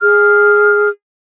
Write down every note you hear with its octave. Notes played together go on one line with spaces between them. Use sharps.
G#4 F6